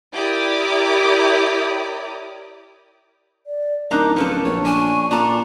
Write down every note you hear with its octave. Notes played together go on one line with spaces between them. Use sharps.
E4 G4 A#4 D5 D6 D#6
D5
D1 D4 D#4 A#4 A#5 D6
F3 C#4 A4 B4
A#1 C#5 C#6
D4 G#5
A#2 D4 A4 A#5